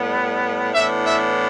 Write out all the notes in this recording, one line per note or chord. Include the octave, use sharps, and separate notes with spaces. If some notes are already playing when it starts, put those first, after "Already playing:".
Already playing: A2 G3 B3
A2 E3 B3 D4 E5
E5